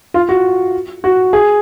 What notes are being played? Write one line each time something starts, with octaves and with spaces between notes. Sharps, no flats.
F4
F#4
F#4
G#4